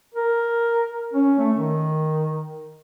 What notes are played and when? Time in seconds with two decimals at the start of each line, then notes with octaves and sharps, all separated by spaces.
0.15 A#4
1.14 C#4
1.39 A3
1.54 D#3